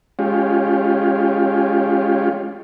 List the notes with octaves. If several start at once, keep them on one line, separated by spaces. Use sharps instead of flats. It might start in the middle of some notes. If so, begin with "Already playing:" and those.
G#3 C#4 F4 G4